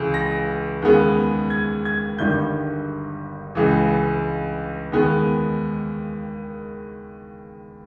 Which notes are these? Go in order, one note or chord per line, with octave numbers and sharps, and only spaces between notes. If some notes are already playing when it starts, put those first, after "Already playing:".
Already playing: C#2 C#3 E3
A#6
D#2 C#3 G#3 B3
G#6
G#6
G1 G2 D#3 G3 G6
C#2 C#3 E3
D#2 D#3 G#3 B3